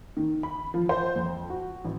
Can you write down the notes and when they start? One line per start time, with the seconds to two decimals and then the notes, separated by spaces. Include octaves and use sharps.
0.17 D#3
0.43 B5
0.74 F3
0.89 C5
1.16 F2
1.50 F#4
1.85 A1